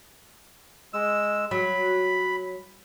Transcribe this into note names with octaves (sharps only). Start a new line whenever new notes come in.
G#3 E6
F#3 B5